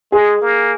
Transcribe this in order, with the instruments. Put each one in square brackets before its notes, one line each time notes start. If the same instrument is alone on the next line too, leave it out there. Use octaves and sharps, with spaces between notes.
[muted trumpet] G#3 [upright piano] G#4
[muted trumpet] A#3